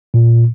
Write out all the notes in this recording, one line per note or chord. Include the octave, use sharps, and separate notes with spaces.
A#2